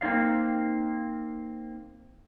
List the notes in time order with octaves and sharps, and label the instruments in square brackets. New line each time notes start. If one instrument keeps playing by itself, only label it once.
[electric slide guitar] A#3 C4 D#4 D5 F5